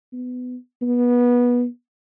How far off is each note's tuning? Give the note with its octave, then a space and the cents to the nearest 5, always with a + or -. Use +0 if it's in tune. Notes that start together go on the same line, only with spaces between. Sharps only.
B3 +20
B3 -20